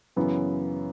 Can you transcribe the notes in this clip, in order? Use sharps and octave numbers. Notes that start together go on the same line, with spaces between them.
F#2 C#3 E3 B3